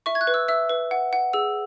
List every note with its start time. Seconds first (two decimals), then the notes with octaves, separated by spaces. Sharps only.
0.06 E5 C#6
0.15 G#6
0.21 F#6
0.27 B4
0.34 E6
0.48 E5 E6
0.69 B4
0.91 F#5
1.13 F#5
1.33 G#4 E6